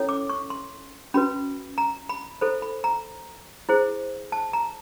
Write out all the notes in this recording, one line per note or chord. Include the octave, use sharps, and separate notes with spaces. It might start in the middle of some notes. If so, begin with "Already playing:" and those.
Already playing: C#4 E4 A4 C#5
D6
C#6
C6
C#4 F#4 B4 B5
A#5
B5
E4 A4 C5 B5
B5
A#5
E4 G#4 C5
A5
A#5